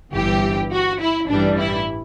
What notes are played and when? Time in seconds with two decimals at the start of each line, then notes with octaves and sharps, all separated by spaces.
0.13 G1 G2 E3 G4
0.71 F#4
1.00 E4
1.28 A1 G2 E3 G3 D4
1.58 E4